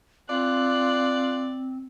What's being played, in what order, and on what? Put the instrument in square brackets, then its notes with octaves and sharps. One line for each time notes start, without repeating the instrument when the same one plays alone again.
[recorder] C4 [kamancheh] F4 F#6 [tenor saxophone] D5